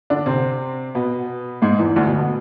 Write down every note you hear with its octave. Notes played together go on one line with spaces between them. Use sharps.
D3 D4
C3 C4
B2 B3
G#2 G#3
E2 E3
D2 D3
B2
B2